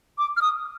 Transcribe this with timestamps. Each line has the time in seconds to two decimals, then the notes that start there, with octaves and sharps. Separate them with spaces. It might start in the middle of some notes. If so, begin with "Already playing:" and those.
0.18 D6
0.37 F6
0.42 D#6